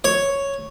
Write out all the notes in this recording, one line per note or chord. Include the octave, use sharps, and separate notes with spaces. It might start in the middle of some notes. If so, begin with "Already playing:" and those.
C#5